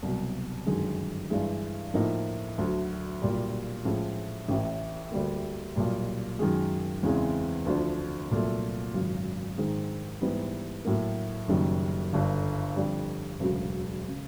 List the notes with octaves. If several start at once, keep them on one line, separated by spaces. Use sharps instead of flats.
C2 B2 F#3
G1 F#2 D#3 G#3
G2 E3 G#3
A2 F3 A#3 D#4
D2 D3 F#3
B1 A#2 G3
A2 F3 G#3 C#4 E4
A1 A2 E3
D2 D3 G3 A#3
B1 A#2 G3
F#2 D#3 G#3
E2 C#3 E3 G#3 C4
D2 D3 F3
C2 A#2 F#3 A3
G#1 F#2 C#3 F#3
G#2 D#3 G#3
G#2 E3 G3 B3
A2 F#3 A#3
F#1 F#2 D#3 G3
G1 G2 D3
F2 D3 G3
E1 D2 C#3 F#3
C#3